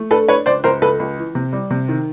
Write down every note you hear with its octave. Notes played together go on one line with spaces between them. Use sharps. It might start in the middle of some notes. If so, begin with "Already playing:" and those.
Already playing: A3
D4 A4 B4
D4 B4 C#5
C#2 C5 D5
C#2 A#4 C5
C#2 A4 B4
C#2
E3
C3
G3
C3
D#3